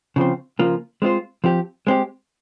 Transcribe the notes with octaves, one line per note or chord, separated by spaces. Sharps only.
C#3 F3 C4
C#3 F3 A#3 F4
G#3 C4 F4 C5
F3 C4 G4
G#3 C4 G4